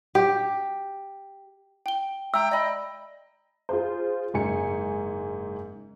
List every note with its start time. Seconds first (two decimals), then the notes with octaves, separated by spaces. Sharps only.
0.15 G4
1.86 G5 G7
2.34 E5 G5 A#5 E6
2.51 D5 D#5 B5
3.69 F4 G#4 C5
4.34 F#1 G#2 G#5 C#7